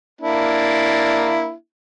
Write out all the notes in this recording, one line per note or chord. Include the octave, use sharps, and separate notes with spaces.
A#3 D4 E4